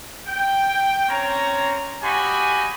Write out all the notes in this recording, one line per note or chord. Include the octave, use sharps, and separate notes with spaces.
G5
C4 C#4 C#5 A#5
F#4 G4 D#5 G#5 B5